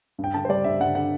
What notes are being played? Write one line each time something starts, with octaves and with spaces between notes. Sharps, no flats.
G2
G5
D3 A5
C5
G3 D5
G2 E5
G2 F#5
D3 F#5